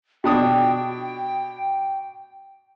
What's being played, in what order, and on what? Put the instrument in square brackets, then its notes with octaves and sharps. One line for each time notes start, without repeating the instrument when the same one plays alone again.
[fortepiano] B2 D4 D#6 [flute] G5